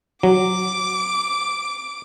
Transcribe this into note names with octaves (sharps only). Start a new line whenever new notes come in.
F#3 D6